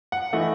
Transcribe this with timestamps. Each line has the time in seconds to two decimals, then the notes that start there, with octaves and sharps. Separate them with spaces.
0.12 F#5
0.33 E3 A3 D#4 F#5